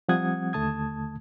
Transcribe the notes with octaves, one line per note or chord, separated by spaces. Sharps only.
F3 G3 C4 F#5 D#6 G#6
D#2 D3 A3 A5 D#6 G#6